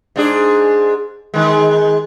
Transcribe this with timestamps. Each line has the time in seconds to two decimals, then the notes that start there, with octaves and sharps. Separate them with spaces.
0.16 G#2 D4 G#4
1.34 D#3 G#3